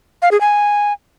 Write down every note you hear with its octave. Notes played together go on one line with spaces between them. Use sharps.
F5
G#4
G#5